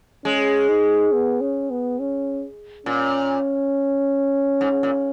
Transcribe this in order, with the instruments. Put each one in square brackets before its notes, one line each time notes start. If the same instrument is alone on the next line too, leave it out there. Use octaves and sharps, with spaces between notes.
[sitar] G#3 [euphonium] C#4
[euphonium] D#4
B3
C#4
B3
C#4
[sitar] A#2 [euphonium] C#4
[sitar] G#2
A#2